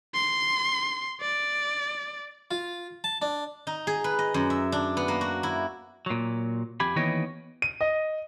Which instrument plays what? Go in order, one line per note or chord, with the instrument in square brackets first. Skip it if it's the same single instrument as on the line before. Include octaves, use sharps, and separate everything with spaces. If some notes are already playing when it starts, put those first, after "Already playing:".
[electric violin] C6
D5
[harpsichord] F4
A5
D4
[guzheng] D#4
G#4
B4
D#5
F#2
E5
D4
B3
A#3
F#4
E4
[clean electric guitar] A#2 F#3
F2 G4 G#5 B5
D#2 E3 B3 C#5 D#5 G5
[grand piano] D#7
D#5